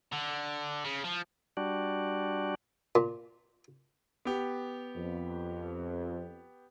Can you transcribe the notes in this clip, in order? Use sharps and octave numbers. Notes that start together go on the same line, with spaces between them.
D3
C#3
F3
G3 D4 F#4
A#2
B3 G4
F2